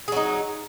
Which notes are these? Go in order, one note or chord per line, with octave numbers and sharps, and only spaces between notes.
F#3 D#4 G#4